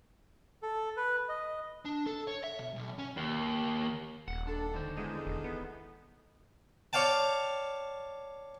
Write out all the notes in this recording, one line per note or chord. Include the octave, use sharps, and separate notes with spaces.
A4
B4
D#5
D4
A4
C#5
E5
B2
B1
C#4
D#2
D#1 F#5
D4 A4
D3 D#3 C5
E2 G#3 D#4 A4
E1
B3
C#5 D5 F5 G5 A5